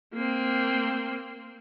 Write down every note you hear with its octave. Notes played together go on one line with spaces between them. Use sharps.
A#3 C4